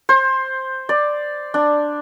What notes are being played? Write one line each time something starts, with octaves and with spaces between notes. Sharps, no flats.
C5
D5
D4